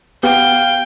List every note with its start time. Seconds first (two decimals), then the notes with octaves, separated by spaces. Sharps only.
0.23 B3 G4 F5 G5